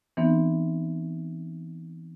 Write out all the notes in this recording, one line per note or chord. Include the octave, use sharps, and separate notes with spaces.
E3 B3 C4 D#4